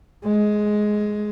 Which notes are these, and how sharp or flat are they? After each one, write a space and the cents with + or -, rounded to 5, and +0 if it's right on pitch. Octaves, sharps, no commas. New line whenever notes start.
G#3 +10